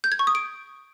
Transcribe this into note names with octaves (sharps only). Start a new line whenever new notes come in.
G6
G#6
C#6
D#6
D7